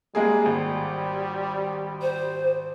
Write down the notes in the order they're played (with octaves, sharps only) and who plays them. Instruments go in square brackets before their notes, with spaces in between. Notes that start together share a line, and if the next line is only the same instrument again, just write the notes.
[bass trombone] G3 [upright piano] G#3 A#3 G#4
[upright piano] G#1
[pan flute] C5